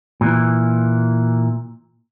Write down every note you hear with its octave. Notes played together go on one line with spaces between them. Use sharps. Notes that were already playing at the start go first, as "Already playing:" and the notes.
A#2 E3